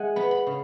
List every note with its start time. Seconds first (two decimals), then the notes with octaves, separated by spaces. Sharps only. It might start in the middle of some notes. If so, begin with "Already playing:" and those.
Already playing: G#3 E5 F#5 G#5
0.16 B3 B5
0.31 B5
0.47 C#3